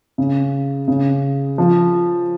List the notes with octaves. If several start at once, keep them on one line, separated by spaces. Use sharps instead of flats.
C#3
C#3
F3